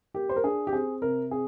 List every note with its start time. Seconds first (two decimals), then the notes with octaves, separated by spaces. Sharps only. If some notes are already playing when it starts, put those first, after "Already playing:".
0.14 A#3 G4
0.29 C5
0.36 A#4
0.44 D4 G#4
0.67 G4
0.73 C4 G#4
1.02 C3 A#4
1.31 C4 G#4